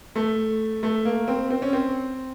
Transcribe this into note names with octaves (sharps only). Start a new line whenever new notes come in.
A3
A3
A#3
C4
C4
C#4
C4